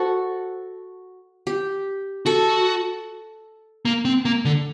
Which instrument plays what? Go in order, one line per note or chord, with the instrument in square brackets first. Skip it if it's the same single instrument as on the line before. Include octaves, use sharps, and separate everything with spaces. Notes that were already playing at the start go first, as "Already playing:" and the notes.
Already playing: [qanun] F#4 A4 C5
G4
[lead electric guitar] F#4 [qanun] A4
[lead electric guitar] A#3
C4
A#3
D3